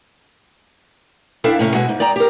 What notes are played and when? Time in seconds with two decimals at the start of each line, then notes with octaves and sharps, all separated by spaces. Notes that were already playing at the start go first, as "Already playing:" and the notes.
1.44 D4 E4 A4 E5 F5 G5
1.59 A2 C3 C#4
1.74 B2 G#3 F#4 E5
1.89 G#2
2.00 D5 D#5 G5 A#5
2.16 G4 A#4